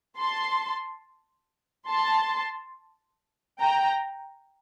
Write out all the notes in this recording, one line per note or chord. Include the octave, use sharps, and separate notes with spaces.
A5 C6
A5 C6
G5 A#5